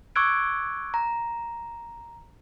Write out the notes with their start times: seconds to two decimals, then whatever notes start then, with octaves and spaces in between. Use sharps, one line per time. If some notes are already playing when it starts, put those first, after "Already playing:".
0.16 C#6 D6 E6 F#6 G#6 D7
0.94 A#5